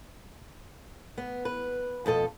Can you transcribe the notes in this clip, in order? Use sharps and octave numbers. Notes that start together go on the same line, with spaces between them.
B3
B4
F2 B2 A4 D#5